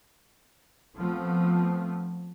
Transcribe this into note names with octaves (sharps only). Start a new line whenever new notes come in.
F3 A3 B3 C4